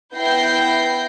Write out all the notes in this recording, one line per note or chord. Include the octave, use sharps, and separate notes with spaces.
B3 E4 G5 G6 A#6 C7